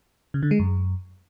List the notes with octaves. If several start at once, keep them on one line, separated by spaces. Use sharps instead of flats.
C#3
D3
G#3
F#2